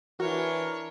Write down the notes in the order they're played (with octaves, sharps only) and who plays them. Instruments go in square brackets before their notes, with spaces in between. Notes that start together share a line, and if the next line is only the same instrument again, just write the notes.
[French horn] E3 [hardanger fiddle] D4 C#5 [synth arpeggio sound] F#4 [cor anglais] A#4